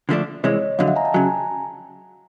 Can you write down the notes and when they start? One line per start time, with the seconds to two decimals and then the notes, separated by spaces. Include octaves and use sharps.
0.09 D3 F3 A3 D4
0.43 C2 C3 E3 G#3 C#5 D#5
0.79 F2 D3 F#3 D#5 F5
0.87 E5 F#5
0.96 G#5 A#5
1.05 G5 A5
1.14 C#3 F#3 G#5 A#5